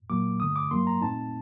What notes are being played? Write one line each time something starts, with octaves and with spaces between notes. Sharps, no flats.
A#2 F#3 A#3 D6
G2 D3 A3 D#6
D6
G2 F#3 A#3 C6
A#5
A#2 A3 C4 D#4 A5